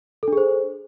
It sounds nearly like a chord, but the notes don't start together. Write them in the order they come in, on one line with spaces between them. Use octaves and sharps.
A4 D4 G#4 C5